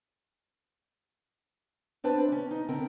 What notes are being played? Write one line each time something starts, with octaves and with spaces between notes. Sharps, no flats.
C4 D4 B4 C5 A5
C#4 D5
D#4
D3 B3 C4 A#4